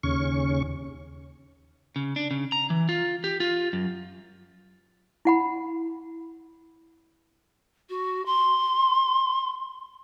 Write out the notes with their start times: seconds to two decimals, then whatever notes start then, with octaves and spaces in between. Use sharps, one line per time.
0.03 D#2 C#3 C#4 C#6
1.96 C#3
2.16 D4
2.31 C#3
2.52 A#5
2.70 E3
2.89 F4
3.24 G4
3.40 F4
3.73 F#2
5.25 E4 F#5 B5
7.89 F#4
8.26 C6